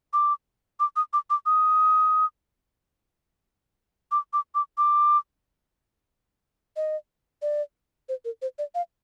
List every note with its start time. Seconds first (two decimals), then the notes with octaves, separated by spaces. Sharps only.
0.13 D6
0.80 D6
0.96 D#6
1.13 D6
1.30 D6
1.46 D#6
4.11 D6
4.33 D6
4.55 D6
4.78 D6
6.76 D#5
7.42 D5
8.09 C5
8.25 A#4
8.42 C5
8.58 D5
8.75 F5